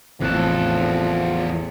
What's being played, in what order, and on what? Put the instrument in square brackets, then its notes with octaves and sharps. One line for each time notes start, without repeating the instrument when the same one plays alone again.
[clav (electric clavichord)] A1 A2 E3 [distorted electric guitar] E2 A4 [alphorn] F3 [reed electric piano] C4 F#6